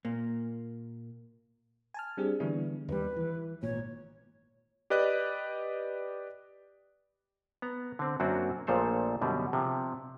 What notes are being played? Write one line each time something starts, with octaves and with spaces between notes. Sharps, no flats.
A#2 A#3
G#5 A5 F6
G3 C4 D4 G4 G#4
D3 E3 G3 B3 D4 E4
D#2 G3 B4
E3
G#1 A#2 C#5
G4 B4 D5 D#5 F#6
B3 A#5
D3 C4
F#2 F#3 A#3 C4 D4 F#4
A#1 A#2 F3 A3 C5 C#5
F#2 B2 D3 G3
C3 F3